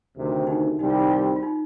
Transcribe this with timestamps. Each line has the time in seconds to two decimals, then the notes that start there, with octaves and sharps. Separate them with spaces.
0.16 D2 C3 D#3
0.47 D#4
0.79 C2 C3 D#3 G3 C4 D#4
0.90 F4
1.00 D#4
1.11 F4
1.36 F4
1.43 D#4